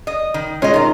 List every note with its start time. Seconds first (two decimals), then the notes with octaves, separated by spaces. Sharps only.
0.07 D#5
0.34 D#3
0.62 G#3 C#4 F4 D#5
0.74 C3 D#3 F4 A#5